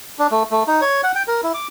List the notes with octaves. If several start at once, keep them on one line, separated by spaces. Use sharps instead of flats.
D4
A3
A3
D#4
C#5
F#5
G5
A#4
E4
D6